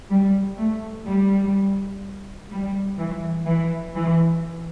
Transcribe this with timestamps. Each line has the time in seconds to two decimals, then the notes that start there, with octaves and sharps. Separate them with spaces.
0.10 G3
0.58 A3
1.06 G3
2.51 G3
2.98 E3
3.46 E3
3.94 E3